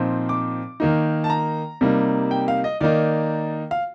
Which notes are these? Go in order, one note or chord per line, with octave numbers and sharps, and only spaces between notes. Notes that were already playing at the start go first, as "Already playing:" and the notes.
Already playing: A#2 F3 C4 D#4
D6
D#3 A#3 D#4
A5
A#5
C3 G3 A#3 D#4
G5
F5
D#5
D#3 A#3 D#4 D5
F5